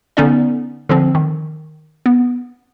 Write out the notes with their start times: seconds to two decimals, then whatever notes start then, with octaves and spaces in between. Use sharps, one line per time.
0.17 D3 B3 C#4 D#4 D5
0.89 D3 F3 C4
1.15 D#3
2.06 B3